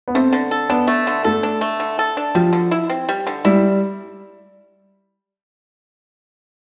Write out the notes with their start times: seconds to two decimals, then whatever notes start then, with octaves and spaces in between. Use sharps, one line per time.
0.08 B3
0.15 A3 C4
0.33 D3
0.51 A4
0.69 B3 D4
0.88 A3
1.07 D3
1.24 A3 A4
1.43 D4
1.61 A3
1.80 D3
1.99 A4
2.17 D4
2.35 F3 G3
2.53 D3
2.71 E4
2.90 C4
3.09 G3
3.27 D3
3.45 G3 E4